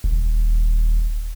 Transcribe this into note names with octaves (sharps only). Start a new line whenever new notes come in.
D#1